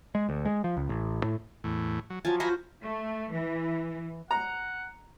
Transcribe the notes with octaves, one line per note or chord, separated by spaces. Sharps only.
G#3
D2
G#3
F3
C#2
A1
A2
E2 A2
F#3
F3 F#3 G#5 A5
F4 F#4 C5 G#5 A#5 B5
A3
E3
F#5 A#5